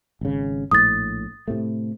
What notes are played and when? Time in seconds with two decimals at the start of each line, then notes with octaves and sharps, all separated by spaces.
0.21 G#1 C#3
0.71 A#1 A2 D#6 A6
1.48 A2 C3 A3